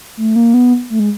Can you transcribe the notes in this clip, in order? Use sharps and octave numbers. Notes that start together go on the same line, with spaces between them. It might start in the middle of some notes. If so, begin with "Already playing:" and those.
A3
A#3
B3
A3
G#3